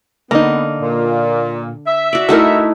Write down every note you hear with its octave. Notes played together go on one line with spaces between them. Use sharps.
D3 A#3 B3 D#4
A#2
E5
F#4 D5
A3 D#4 E4 F#4 A#4